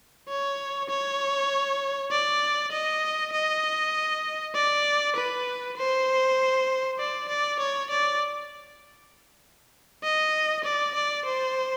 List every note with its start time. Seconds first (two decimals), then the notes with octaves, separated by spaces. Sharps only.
0.29 C#5
0.90 C#5
2.11 D5
2.72 D#5
3.33 D#5
4.55 D5
5.16 B4
5.77 C5
6.99 D5
7.29 D5
7.60 C#5
7.90 D5
10.04 D#5
10.65 D5
10.95 D5
11.25 C5